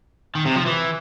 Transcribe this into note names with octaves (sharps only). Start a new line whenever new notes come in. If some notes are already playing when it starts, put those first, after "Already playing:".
D#3
C3
F3
E3